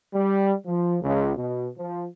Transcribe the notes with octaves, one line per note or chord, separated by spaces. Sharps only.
G3
F3
C#2
B2
F3